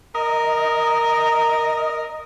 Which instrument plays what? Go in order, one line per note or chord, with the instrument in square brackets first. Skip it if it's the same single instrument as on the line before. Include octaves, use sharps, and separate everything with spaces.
[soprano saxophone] A#4 [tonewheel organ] D#5